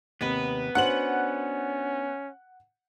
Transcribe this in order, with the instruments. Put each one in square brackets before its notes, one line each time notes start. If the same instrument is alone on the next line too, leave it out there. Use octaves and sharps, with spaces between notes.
[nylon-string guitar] D#2 C3 D#5 [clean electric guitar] B3 B4
[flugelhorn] C#4 [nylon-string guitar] D4 F#4 C5 [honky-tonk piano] F#5 F#7